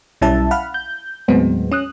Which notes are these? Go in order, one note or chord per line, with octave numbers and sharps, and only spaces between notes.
B1 G3 C#4 E4 E5 A5
F5 F#5 B5 F6
G6
D#2 A2 F#3 G#3 B3 C4
C#4 D#6 F#6